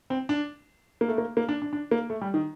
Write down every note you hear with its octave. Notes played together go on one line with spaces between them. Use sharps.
C4
D4
A#3
A3
A#3
A#3
D4
D4
D4
A#3
A3
G3
D#3